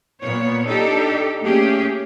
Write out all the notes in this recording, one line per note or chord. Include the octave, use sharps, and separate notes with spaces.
A#2 B3 C#5
D4 D#4 G4 A4
A3 A#3 C#4 G4 G#4